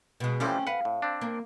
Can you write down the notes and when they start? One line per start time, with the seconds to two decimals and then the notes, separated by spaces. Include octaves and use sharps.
0.20 B2 G#3
0.40 E3 F3 G3 A3 C4 C#4
0.67 B4 F5 F#5
0.85 A2
1.02 C4 D4
1.21 A#3